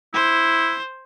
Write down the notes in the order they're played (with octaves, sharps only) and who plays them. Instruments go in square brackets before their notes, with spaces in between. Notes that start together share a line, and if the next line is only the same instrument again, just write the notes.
[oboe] E4 [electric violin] C5